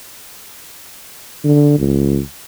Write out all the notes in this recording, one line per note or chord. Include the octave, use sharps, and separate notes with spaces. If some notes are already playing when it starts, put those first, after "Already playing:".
D3
C#2